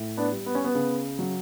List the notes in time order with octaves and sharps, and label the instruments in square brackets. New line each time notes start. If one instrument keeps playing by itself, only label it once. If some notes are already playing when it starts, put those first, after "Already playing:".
Already playing: [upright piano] A2
B3 D4
G3
B3
C#4
B3
C#3
F#3